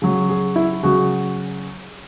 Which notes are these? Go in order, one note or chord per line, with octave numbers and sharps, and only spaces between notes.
C#3 F#3
G#4
E4
C#3 F#3 F#4